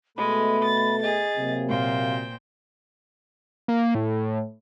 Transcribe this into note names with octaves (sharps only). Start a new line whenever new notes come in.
B2 G#3 A3 B5
A6
G#4 D#5 A6
C3 F#3 A#3
A#2 C5 F5 G5
A#3
A2